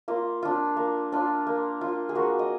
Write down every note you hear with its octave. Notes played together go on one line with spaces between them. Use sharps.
A#3 F4
D4 F4
A#3
D4 F4
A#3
F4
G#4
A#3 F#4
D#5